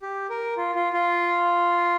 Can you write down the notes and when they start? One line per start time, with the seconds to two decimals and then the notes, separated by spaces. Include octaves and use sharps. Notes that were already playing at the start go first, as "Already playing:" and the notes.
0.02 G4
0.30 A#4
0.57 F4
0.75 F4
0.93 F4